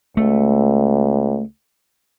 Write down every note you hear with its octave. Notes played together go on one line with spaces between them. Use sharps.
C#2 A3